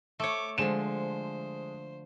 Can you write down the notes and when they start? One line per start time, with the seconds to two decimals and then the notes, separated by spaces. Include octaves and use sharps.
0.20 A3 C#5 D6
0.58 D3 F3 G#3 C5 E7